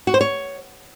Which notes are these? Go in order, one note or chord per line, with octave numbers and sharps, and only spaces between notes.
F#4
C5
C#5